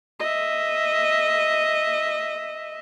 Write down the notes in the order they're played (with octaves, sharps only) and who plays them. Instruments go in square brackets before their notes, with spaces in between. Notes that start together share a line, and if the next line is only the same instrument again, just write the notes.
[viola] D#5 E5